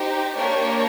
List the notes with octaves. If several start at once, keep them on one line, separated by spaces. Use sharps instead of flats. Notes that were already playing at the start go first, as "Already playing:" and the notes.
Already playing: D#4 G4 C5
A#3 D4 G4 A#4 C#5